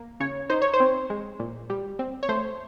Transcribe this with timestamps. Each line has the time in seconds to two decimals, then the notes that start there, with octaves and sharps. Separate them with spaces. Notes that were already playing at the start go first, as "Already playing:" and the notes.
Already playing: A#3
0.20 C#3 C#5
0.50 D#4 C5
0.62 C#5
0.73 C5
0.80 C4
1.10 G#3
1.40 A#2
1.70 G3
1.99 C4
2.23 C#5
2.29 A3 C5